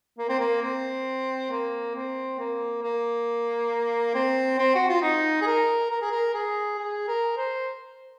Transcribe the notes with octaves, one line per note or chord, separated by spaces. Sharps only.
A#3
C4
A#3
C4
A#3
C4
A#3
A#3
C4
C4
F#4
F4
D#4
G#4
A#4
A#4
G#4
A#4
G#4
G#4
A#4
C5